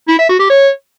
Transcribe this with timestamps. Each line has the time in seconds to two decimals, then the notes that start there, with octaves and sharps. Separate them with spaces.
0.08 E4
0.19 E5
0.29 F#4
0.39 G4
0.50 C#5